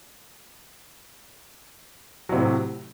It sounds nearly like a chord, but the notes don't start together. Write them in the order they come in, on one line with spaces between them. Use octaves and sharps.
F#3 C3 A2